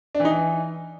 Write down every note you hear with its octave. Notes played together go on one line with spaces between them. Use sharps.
D4
E3
D#4
E3